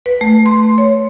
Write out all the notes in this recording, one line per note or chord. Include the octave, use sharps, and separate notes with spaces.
B4
A3
C6
C#5